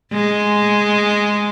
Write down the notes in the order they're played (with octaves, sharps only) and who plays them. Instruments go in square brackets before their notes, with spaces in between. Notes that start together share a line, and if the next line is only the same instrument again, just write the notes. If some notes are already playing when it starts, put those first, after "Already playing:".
[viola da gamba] G#3